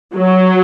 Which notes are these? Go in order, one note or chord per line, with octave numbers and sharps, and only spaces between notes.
F#3